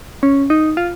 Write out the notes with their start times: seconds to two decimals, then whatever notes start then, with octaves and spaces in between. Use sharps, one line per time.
0.23 C#4
0.50 D#4
0.77 F4